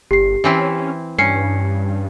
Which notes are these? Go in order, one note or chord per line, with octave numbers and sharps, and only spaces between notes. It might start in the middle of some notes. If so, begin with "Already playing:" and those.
G1 G4 C7
E3 C4 C#4 E4
G2 C#4 C7 C#7